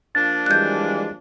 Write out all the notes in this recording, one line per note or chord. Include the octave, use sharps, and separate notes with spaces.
F3 A#3 D4 A6
E3 G3 G#3 F#6 G6